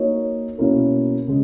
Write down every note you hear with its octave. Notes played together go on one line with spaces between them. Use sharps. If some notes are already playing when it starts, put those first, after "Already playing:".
Already playing: A#3 D#4 F#4 C#5
B2 A#3 C#4 E4 A#4
C#3 G#3